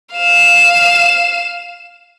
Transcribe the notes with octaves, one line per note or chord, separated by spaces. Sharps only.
F5 E7